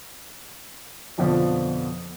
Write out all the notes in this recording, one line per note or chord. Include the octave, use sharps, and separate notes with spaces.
F2 B2 D3 F3